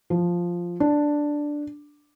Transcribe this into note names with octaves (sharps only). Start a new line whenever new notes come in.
F3
D4